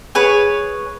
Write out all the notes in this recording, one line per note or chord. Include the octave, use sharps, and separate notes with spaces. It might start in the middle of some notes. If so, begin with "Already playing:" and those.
G#4 B4 C#5